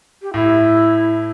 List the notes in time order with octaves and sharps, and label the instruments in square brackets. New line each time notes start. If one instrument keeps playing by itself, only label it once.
[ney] G4
[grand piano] A2 [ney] E4